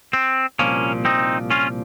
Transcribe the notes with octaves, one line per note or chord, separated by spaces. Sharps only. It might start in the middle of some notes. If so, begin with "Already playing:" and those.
C4
C2 A#2 F3 A#3 C#4
C4 D#4
C#4 F4